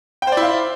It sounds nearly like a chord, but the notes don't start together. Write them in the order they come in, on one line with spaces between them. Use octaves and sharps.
G5 C5 D5 E4 F5